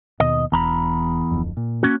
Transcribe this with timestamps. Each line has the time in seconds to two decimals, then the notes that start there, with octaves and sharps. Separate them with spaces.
0.20 D#2 B2 D#5
0.52 E1 E2 A#5 B5
1.31 D1 F2
1.57 A#2
1.83 A#3 C#4 F#4